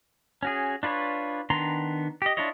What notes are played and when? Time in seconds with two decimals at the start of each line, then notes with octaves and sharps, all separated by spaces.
0.43 C#4 F#4 G#4
0.83 D4 F4 B4 C#5
1.50 D#3 B3 D4 A#5 C6
2.22 G4 D#5
2.37 D4 E4 F4 C#5 D#5